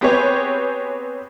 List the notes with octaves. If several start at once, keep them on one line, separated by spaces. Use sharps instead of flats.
B3 C4 G4 G#4 B4 C#5